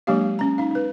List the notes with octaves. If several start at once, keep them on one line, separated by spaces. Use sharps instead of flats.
F#3 G#3 A#3 D4 G4 F5
C#4 A#5
D#4 F5
D#4 B4